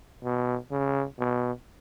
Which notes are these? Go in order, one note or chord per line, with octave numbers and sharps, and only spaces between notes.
B2
C#3
B2